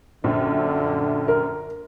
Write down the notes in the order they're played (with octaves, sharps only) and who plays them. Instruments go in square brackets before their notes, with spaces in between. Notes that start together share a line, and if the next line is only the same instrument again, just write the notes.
[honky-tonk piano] A#1 F#2 [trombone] D3
[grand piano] A#4